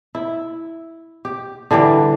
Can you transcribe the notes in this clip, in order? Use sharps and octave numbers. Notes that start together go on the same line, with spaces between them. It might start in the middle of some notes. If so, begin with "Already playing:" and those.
E4
G4
D3 E3 G3 G5